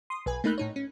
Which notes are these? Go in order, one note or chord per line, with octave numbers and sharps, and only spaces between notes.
C6 D#6
B1 B4 G#5
A3 A#3 D#4 B5 F#6 G6
A2 D#4 C#5
C#4